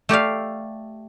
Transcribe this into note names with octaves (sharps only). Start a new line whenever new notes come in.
A3 G4 D5 F5